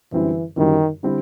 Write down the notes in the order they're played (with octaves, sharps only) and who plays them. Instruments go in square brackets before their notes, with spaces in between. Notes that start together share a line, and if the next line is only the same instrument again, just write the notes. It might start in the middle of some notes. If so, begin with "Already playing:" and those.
[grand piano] F#2 D3 G3 C4 E4 [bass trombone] E3
[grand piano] F#2 D3 G3 C4 E4 [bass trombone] D#3
[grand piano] D3 G3 C4 E4